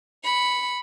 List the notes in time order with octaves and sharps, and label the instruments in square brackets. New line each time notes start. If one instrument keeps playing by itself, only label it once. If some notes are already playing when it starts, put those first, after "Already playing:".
[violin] B5 C#7